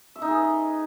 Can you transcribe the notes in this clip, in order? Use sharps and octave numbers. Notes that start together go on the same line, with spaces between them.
E5
D#4
G#4
B4